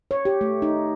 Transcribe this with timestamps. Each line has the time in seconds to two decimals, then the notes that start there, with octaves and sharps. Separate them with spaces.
0.11 C#5
0.25 G4
0.41 A3
0.62 D#4